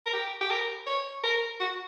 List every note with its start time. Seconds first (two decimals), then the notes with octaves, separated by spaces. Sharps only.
0.06 A#4
0.13 G4
0.41 G4
0.50 A#4
0.87 C#5
1.24 A#4
1.60 F#4